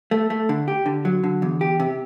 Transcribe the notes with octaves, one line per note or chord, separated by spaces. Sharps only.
A3
A3
D3
G4
D3
F#3
D3
E2
G4
C3